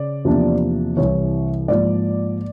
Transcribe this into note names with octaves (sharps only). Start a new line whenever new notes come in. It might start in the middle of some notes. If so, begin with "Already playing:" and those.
Already playing: C#3 D5
E2 C3 F3 A#3 D4
C2 C3 E3 C#5
G#2 F3 A#3 D5